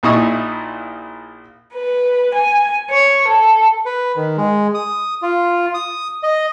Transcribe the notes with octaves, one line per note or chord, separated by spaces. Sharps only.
A#1 A#2 D#4 E4 C#6 D#6
B4
G#5
C#5
A4
B4
D#3
G#3
D#6
F4
D#6
D#5